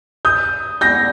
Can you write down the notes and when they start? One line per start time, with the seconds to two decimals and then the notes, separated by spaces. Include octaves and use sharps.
0.25 D#6 G6
0.81 G6 A#6